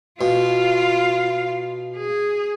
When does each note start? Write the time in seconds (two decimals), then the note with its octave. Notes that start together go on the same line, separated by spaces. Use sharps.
0.21 B2 F4 F5
1.97 G#4